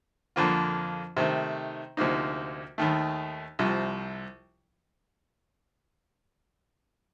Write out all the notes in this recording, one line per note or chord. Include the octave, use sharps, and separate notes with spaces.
F2 D3 F3 A#3 F4
C3 D#3 A3
D2 C3 F3 A#3 D#4
D#2 D#3 A3
C2 C3 F3